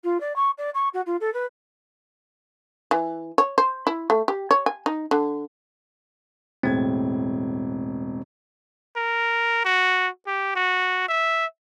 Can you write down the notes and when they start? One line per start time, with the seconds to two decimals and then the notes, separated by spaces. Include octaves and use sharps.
0.03 F4
0.20 D5
0.35 C#6
0.57 D5
0.74 C#6
0.93 F#4
1.06 F4
1.20 A4
1.33 B4
2.91 E3
3.38 C#5
3.58 C5
3.87 E4
4.10 A3
4.28 G4
4.51 C#5
4.66 G#5
4.86 D#4
5.11 D3
6.63 E1 A2 C4 G#6
8.96 A#4
9.65 F#4
10.27 G4
10.56 F#4
11.09 E5